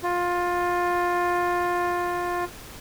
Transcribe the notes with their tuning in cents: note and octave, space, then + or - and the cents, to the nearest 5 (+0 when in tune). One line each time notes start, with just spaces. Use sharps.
F4 +15